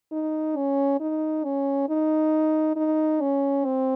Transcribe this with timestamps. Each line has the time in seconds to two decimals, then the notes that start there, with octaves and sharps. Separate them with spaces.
0.12 D#4
0.56 C#4
1.00 D#4
1.44 C#4
1.89 D#4
2.76 D#4
3.21 C#4
3.65 C4